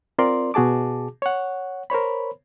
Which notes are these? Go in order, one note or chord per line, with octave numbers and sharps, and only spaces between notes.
C4 F4 A#4 D5 C6
B2 F#4 G#4 A5 D6
C#5 F#5
A#4 C5 C#5 B5